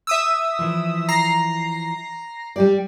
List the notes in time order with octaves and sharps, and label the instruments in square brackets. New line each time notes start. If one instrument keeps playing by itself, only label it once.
[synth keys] E5 D#6 E6
[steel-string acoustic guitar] E3 F3
[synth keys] A#5 A#6 C7
[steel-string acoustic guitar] G3 G4 D5